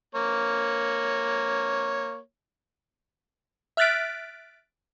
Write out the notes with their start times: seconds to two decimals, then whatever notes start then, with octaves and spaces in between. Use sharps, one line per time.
0.15 A#3 C#5
3.77 E5 F6 F#6 A6 B6 D7